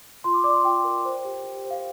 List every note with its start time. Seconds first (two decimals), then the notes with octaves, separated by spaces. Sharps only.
0.24 F4 C6
0.34 D6
0.44 D5 D6
0.54 C6
0.64 F4 G5
0.84 A#4
1.05 C5
1.25 G4
1.45 G4
1.65 C5
1.71 F5